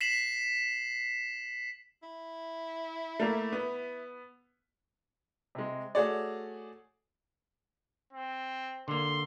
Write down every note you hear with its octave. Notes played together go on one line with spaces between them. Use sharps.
B6 C7 E7 F#7
E4
A3 A#3
B3
C3 G#3
A3 F#4 G#4 C#5 D5
C4
D3 A#3 C6